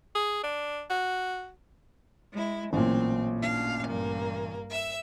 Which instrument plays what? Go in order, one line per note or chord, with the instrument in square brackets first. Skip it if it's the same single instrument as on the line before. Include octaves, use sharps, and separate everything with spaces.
[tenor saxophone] G#4
D4
F#4
[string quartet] G#3 E4
[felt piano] A1 A#2 [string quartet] F#3 C4
[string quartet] D4 F5
G2 A#3
E5 E6